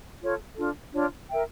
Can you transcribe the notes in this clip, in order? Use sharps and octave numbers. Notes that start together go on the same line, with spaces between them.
F4 A4 C#5
D4 F4 A4
D4 F4 C#5
A#4 E5 G5